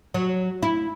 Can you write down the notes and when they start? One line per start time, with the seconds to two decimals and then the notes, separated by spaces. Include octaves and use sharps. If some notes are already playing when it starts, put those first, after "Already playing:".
0.14 F#3
0.63 E4